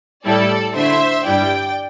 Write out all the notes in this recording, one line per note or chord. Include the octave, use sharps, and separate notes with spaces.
A2 G3 E4 A4 D5
D3 A3 E4 C5 E5
G2 G3 E4 D5 G5